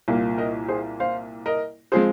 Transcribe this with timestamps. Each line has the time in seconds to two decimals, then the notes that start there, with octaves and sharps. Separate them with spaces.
0.08 C2 A#2 A#3
0.38 A#4 D#5
0.68 G#4 C5
1.00 C5 F5
1.46 A#4 D#5
1.92 F3 G#3 C4 G#4 C5